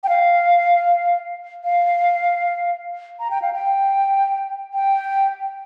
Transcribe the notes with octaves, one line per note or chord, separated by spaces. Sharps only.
G5
F5
F5
A#5
G5
F5
G5
G5